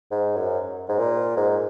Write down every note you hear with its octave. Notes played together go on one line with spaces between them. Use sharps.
G#2
F#2
G#2
A#2
G#2